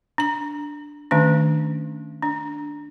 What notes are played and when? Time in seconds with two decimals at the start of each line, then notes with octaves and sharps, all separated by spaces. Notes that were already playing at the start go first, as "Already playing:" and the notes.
0.18 D4 A#5
1.11 D#3 A3 C#4 D4
2.22 D4